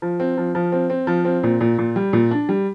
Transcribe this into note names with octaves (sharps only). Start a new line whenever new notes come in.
F3
C4
F3
F3
C4
C4
F3
C4
A#2
A#2
A#2
G3
A#2
D4
G3